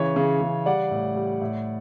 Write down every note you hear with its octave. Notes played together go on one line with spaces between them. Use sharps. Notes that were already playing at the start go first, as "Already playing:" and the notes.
Already playing: C#3 E3 C#5
C#3
C#3
G3 D5 F#5
A2
G3
A2